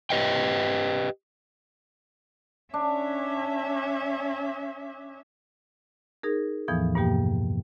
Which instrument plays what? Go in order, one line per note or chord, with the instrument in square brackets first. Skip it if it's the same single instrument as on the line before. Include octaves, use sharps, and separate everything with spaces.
[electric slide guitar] G4 B4 D#5 E5 G5
[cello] C#4 E5 [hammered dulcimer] D4
[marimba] D#4 G#4 A#4
E2 A2 E3 F3 B3 D#6
G2 B2 A#3 G4 G5